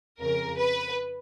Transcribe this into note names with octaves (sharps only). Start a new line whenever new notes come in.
F2 C#3 A#4
B4